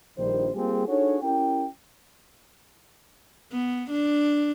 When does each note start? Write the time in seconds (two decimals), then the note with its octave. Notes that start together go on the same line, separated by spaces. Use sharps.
0.18 A#1 D#3 G3 C5
0.54 G3 A#3 C4 F4 G4 G#4
0.88 D4 D#4 F#4 G#4 A4 C#5
1.23 C#4 E4 G4 A#4 G5
3.52 B3
3.90 D4